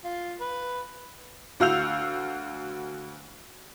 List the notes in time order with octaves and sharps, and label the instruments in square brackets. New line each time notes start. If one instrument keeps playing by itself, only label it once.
[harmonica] F4
B4
[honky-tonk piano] D2 F#4 F5 E6 G6 F7